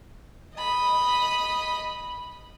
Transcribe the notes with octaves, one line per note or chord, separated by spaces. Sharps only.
D#5 B5